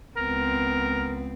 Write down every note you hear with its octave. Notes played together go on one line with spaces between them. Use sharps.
C#2 B3 C4 A#4